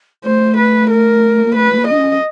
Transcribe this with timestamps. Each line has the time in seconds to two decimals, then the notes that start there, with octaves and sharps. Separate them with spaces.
0.25 A3 C5
0.57 B4
0.90 A#4
1.46 A#3
1.55 A3 B4
1.72 A3
1.77 A#3
1.88 D4 D#5
1.98 C#4